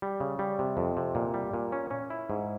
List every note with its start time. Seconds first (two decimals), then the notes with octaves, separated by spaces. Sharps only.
0.02 G3
0.20 C#3
0.39 G3
0.59 C3
0.77 F2
0.97 C3
1.15 A#2
1.34 G3
1.54 A#2
1.72 C#4
1.91 C#4
2.10 E4
2.30 G#2